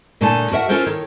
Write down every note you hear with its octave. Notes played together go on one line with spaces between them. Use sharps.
A#2 D3 A3 D#4 G#5 A5
F#4 A#4 E5 F#5
C#4 F4 A4 A#4 C5
D#3 C#5